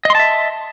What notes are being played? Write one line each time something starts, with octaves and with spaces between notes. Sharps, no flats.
D#5 E5 A5 C6